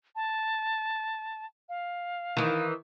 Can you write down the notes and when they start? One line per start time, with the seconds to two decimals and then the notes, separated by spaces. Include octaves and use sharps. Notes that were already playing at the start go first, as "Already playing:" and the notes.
0.16 A5
1.69 F5
2.37 D#3 E3